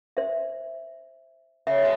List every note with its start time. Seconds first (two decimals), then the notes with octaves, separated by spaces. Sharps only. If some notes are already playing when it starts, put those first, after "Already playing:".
0.17 C5 E5
1.67 C#3 E5
1.83 B2 G#3